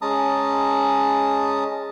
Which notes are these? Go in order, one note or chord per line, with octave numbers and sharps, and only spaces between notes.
G#3 C#4 A5 A#5 D#6